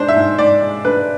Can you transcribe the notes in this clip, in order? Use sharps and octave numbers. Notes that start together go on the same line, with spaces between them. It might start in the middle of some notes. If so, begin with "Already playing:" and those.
Already playing: G#2 G#3 D4 C5
E5
G#2
G#2 D5
G#3
D4 B4